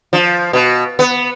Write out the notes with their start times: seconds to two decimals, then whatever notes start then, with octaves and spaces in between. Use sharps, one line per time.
0.13 F3
0.53 B2
0.99 B3